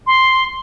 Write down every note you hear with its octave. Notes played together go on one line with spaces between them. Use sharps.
C6